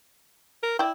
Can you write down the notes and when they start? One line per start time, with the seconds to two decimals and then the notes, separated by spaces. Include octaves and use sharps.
0.63 A#4
0.79 E4 D5 G5